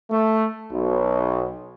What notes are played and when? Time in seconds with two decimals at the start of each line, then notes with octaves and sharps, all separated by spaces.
0.10 A3
0.71 B1